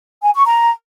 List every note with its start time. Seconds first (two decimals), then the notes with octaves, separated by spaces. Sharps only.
0.22 G#5
0.33 C#6
0.45 A#5